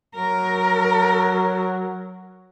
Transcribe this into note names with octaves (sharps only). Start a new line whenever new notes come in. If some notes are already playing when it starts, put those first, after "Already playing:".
F#3 A#4